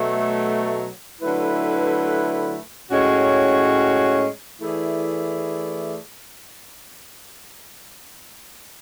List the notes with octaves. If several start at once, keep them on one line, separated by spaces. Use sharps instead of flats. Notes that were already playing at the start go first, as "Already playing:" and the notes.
Already playing: B2 F#3 A3
D3 F#3 A3 E4 B4
A2 G#3 C#4 F#4 C#5
E3 A3 E4 G#4 D5